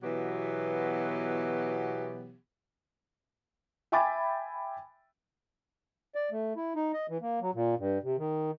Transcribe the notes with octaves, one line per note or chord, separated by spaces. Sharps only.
B2 E3 F#3 B3 F#4 G4
E5 G5 G#5 B5 D6 A6
D5
A3
E4
D#4
D#5
E3
A#3
F#3
A#2
G2
C3
D#3